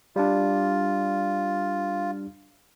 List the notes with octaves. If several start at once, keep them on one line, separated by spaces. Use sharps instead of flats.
G3 D4 F4